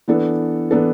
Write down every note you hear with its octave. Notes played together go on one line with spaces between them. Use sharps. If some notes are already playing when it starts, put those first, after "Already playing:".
E3 B3 D4 A4
E3 B3 D4 A4